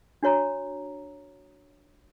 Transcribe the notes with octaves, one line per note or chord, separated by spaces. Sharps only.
D4 F#4 C#5 A#5